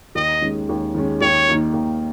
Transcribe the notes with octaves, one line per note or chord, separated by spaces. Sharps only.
D#2 D#5
D#3 G#3 C#4
D#2
D#3 G#3 C#4
D#2 C#5
D#3 A#3 D#4 A#4
D#2